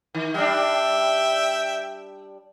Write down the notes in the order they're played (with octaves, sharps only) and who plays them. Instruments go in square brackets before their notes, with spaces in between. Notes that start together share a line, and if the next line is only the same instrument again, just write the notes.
[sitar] D#3
[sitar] G3 D4 [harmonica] E5 G5